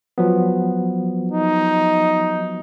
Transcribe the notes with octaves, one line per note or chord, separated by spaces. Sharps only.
F3 F#3 B3
D#4